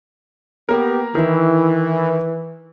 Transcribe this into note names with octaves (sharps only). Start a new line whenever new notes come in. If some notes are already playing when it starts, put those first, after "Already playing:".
A#3 B3 G4 A#4
D#3 E3 E4